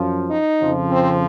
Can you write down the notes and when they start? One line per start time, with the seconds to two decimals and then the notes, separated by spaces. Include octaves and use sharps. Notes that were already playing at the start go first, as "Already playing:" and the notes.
Already playing: F#2 F3
0.30 D#4
0.60 F2 C#3 F3
0.91 C4